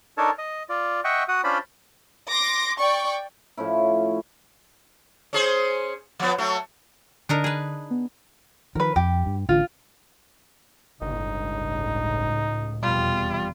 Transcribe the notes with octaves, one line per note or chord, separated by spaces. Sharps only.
D4 D#4 A4 A#4 C#5 A5
D#5
F4 D5
D#5 E5 F#5 G5 C#6
F#4 F#5 D#6
C#4 D4 F4 C5 D5 B5
C6 D6 A#6
D5 G5 C#6
A2 F3 C#4 E4
C#4 G#4 C5
F3 B3
F#3 A3
D3 D4 D#4 A#4
G#4 B4
B3
D#3 F3 A#4 B4
F2 G4
G2
A1 D3 F4
G1 C#2 A2 D#4
F1 E2 B2 G3 F4